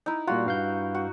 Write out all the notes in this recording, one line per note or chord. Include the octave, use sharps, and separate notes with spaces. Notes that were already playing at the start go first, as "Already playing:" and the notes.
D#4 E4
A#2 G3 F4 F#4
G2 F5 G6
F#4